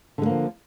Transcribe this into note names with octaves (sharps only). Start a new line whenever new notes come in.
D3 F3 G#3 A#3